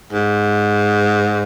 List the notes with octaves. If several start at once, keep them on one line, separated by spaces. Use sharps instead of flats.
G#2